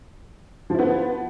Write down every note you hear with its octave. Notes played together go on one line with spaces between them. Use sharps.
F3 B3 E4